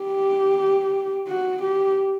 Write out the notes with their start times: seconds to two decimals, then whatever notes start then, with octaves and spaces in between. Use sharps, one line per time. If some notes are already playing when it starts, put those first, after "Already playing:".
Already playing: G4
1.28 F#4
1.62 G4